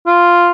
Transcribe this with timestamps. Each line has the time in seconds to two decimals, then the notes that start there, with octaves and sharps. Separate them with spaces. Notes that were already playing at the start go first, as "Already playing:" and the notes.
0.07 F4